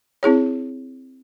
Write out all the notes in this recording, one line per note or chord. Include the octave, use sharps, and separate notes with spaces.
C4 E4 G#4 C#5